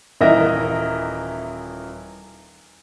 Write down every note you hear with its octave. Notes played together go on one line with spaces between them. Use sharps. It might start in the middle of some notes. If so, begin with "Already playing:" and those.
D#1 E3 A#4 D#5 E5 A#6